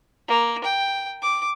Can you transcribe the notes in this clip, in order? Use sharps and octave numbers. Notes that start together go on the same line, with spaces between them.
A#3
G5
D6